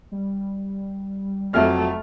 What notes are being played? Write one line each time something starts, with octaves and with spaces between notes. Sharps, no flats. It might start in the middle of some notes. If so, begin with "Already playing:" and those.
G3
F1 F2 F#3 A3 E5 F6